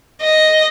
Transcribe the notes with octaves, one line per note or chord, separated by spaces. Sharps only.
D#5